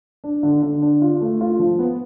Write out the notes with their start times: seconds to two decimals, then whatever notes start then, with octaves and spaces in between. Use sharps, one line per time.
0.24 D4
0.43 D3
0.63 D3
0.82 D4
1.02 F4
1.21 A3
1.41 F4
1.59 F3
1.79 B3